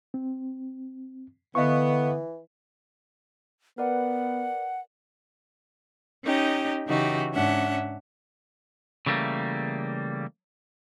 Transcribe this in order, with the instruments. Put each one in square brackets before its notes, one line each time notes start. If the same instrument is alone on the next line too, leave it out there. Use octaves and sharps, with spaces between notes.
[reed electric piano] C4
[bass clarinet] D3 [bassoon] E3 [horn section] B3 [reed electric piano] D#5 F5 C#6
[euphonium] B3 [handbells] A#4 B4 D5 [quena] F#5
[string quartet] C#4 D#4 G4 D#5
C#3 E3 D#4 F#4 G4
G#2 C#4 D4 E5 F#5
[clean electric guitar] C#3 E3 G3 A3 A#3